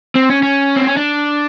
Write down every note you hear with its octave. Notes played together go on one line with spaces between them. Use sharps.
C4
C#4
C#4
C4
C#4
D4